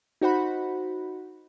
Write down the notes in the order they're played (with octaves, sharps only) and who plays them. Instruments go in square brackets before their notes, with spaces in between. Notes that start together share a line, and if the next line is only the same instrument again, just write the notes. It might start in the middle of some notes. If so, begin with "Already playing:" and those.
[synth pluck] D#4 F#4 C5 F#5 B5